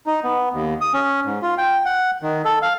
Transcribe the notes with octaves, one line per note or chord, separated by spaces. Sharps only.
D#4
B3
D#2
D#6
C#4
G#2
F4
G5
F#5
D#3
A4
F5